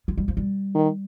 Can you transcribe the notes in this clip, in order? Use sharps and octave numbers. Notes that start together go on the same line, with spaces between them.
G#3
G3
F3
G3
D#3